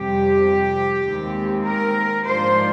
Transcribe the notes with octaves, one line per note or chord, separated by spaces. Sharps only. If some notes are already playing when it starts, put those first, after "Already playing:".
Already playing: F2 C3 G3 G4
D#2 D#3 G#3 C4
A#4
G#2 F3 A#3 D4 F4 C5